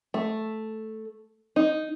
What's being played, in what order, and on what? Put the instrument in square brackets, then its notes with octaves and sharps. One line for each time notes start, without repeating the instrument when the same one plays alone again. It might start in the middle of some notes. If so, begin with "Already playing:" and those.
[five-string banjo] A3
D#4